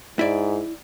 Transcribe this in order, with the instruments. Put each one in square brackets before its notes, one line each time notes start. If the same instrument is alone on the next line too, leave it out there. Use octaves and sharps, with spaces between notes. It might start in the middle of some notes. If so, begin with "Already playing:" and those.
[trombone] G#2 [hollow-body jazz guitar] E4 D5